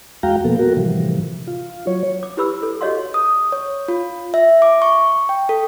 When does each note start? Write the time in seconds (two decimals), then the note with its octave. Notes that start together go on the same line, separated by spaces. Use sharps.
0.23 E2 G#3 F#4 F5 G5 A#5
0.44 B2 F3 A#3 B3 A4
0.59 F#4 A#4
0.77 A2 C3 E3 F3 G3
1.47 F4
1.87 F#3 C#5
2.23 D6
2.37 E4 G4 B4 B5 E6
2.63 A4
2.81 F#4 G4 C#5 D#5 F5 C6
3.14 D#6
3.52 C#5
3.88 F4
4.34 E5
4.62 D6
4.82 C#6
5.29 G5
5.49 A4